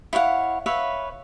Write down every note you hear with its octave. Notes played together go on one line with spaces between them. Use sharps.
E4 C#5 F5 F#5
B4 C#5 E5 F5